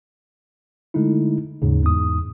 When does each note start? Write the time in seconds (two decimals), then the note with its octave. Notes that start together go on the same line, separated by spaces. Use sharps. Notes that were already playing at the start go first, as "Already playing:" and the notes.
0.94 D3 G#3 A3 D#4 E4
1.62 D#2 G#2 C#3
1.83 E2 G#2 D#6